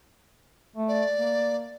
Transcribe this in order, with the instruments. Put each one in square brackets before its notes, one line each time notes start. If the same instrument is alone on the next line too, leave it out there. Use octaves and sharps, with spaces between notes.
[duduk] A3
[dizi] D5
[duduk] A#3